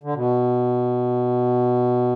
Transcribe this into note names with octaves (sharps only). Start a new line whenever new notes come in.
D3
B2